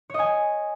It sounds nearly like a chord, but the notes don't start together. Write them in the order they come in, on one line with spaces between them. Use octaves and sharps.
C#5 D#5 G#5